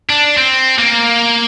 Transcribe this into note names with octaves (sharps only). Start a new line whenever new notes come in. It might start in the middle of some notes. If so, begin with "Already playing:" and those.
D4
C4
A#3